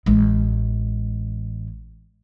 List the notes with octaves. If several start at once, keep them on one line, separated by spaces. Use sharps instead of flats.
A1 G#3